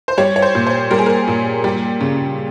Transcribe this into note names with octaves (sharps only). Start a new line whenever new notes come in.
C5
G3 C#5
C#5
C5
A#2
C5
G3 A#4
G#4
A#4
A#2
G3
C#3